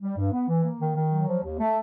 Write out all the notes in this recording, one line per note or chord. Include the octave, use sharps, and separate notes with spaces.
G3
G2
B3
E3
A#3
D#3
D#3
F#3
F3
D#2
A3